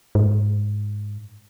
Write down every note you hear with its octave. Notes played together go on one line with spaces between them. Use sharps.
G#2